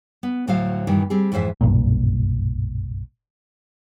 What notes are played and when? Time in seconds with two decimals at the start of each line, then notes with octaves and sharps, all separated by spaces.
0.23 B3
0.47 D2 A2 D3 F#3 C5 F5
0.87 G2 A#2 D#3 E3 G3
1.10 G3 C4 G#4
1.32 F2 G#2 E3 C5 E5
1.61 F#1 B1 G2 A#2